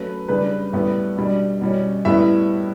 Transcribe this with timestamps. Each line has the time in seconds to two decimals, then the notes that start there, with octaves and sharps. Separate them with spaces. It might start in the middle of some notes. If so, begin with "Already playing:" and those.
Already playing: F#3 A3 C#4 B4
0.28 C#3 G3 D4 B4
0.73 A2 G3 B3
1.17 B2 G3 D4
1.61 B2 G3 C#4
2.05 A2 G3 B3 E4 E5